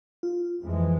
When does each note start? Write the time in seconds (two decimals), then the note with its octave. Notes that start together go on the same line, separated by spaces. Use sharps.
0.23 F4
0.62 F2 E3 G#3